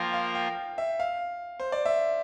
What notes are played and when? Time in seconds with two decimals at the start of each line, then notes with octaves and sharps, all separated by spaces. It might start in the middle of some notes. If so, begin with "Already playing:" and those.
Already playing: F3 A#3 F4 A#4 F5 G5
0.14 F5
0.35 G5
0.78 E5
1.00 F5
1.60 C5
1.72 D5
1.85 E5